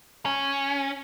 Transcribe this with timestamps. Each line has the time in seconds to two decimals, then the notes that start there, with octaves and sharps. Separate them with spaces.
0.25 C#4